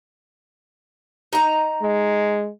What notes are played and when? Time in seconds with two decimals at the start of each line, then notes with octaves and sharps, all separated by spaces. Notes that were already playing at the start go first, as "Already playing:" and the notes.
1.33 D#4 A#5
1.82 G#3